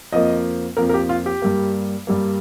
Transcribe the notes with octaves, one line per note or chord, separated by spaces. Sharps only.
F2 F3 A#3 D#5
F2 F3 A#3 A#4
A#4
G4
F4
G4
G2 G3 A#3
G2 G3 A#3